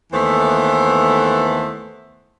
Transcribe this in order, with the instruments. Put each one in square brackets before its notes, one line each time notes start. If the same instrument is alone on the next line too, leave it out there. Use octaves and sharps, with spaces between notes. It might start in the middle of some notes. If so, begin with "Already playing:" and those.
[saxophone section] D#2 E3 A3 B3 A4 C5